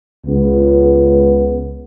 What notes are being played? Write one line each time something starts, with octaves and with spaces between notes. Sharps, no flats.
C#2 B3